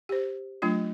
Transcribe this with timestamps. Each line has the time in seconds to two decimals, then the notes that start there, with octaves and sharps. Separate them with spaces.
0.09 G4 C5
0.62 F#3 A3 D4 F4 D#5